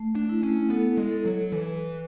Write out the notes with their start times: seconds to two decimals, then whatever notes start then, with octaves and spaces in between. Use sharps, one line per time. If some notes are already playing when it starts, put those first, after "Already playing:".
Already playing: A3
0.15 D4
0.29 E4
0.43 C#4
0.70 B3 A4
0.97 G#3
1.11 A4
1.25 F#3
1.52 E3 B4